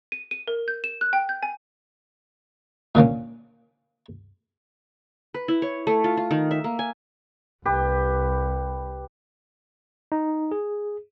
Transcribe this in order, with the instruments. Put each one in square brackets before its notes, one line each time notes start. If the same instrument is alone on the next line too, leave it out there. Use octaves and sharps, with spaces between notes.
[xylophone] D#7
D#7
A#4
G6
E7
F#6
G5
G6
G#5
[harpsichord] A#2 D3 A#3 C#4
[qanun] B4
E4
C#5
A3
F4
F4
D#3
E5
A#3
G#5
[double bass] C2 [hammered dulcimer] G4 B4
[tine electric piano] D#4
G#4